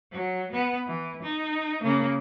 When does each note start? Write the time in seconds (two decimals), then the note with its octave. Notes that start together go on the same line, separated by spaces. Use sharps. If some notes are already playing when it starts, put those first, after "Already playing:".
0.12 F#3
0.52 B3
0.87 E3
1.22 D#4
1.83 C#3 A#3